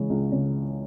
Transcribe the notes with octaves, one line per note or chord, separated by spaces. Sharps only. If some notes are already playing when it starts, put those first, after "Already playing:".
Already playing: C#3 E3 G#3
C#2
C#3